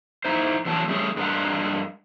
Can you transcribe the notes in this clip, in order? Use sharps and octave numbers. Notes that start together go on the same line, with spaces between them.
D#4 E4 C5
E2 C#3 F#3 B3 A5
G3 A3 C#4 G#4 C#5
G2 G#3 B3 D4 A#4 F#5